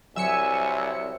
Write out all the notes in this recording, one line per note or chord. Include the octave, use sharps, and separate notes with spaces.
C2 F#3 C5 E5 G#5 E6 C#7